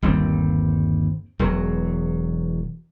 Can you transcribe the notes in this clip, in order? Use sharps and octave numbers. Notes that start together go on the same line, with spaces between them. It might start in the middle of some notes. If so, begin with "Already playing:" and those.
G1 D#2 G3 C4
E1 E2 F#3